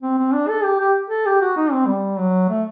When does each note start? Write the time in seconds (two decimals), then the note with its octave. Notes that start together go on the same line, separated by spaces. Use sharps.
0.02 C4
0.18 C4
0.33 D4
0.48 A4
0.63 G4
0.80 G4
1.10 A4
1.26 G4
1.42 F#4
1.57 D#4
1.72 C4
1.87 G3
2.18 F#3
2.49 A3